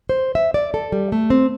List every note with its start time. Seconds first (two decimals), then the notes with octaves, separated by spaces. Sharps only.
0.09 C5
0.35 E5
0.54 D5
0.74 A4
0.92 G3
1.12 A3
1.30 C4